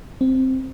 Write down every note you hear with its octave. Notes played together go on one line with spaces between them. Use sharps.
C4